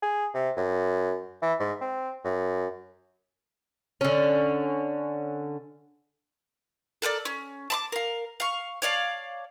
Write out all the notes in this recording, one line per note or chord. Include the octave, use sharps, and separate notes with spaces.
G#4
C3
F#2
E3
G#2
C4
F#2
D3 C#4
A4 A#4 C5 D5
C#4
A5 B5 D6
A#4 F5
F5 C#6
C#5 D5 F5 A5